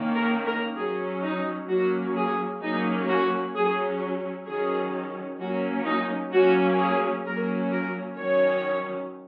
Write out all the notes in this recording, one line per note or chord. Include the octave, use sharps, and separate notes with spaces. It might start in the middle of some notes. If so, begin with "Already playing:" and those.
Already playing: D#3 A#3 C#4
A#4
A#4
F#3 C#4 G#4
D#4
F#3 A#3 C#4 F#4
G#4
F#3 A#3 C#4 D#4
F#4
F#3 C#4 G#4
D#3 F#3 C#4 G#4
F#3 A#3 C#4 F#4
D#4
F#3 A#3 C#4 F#4
G#4
F#3 A#3 C#4 A#4
A#4
D#3 F#3 C#4 C#5